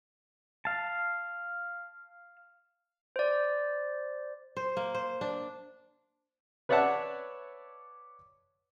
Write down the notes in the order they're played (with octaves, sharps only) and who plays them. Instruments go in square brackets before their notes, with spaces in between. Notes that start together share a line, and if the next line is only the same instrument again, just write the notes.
[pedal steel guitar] F5 A5
[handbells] C5 D5
[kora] C5
A#3
C5
D4
[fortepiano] B4 C#5 D5 E5 F#5 A5